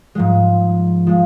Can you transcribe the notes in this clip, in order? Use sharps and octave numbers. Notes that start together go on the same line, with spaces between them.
G#2 F3 G#3
F3 G#3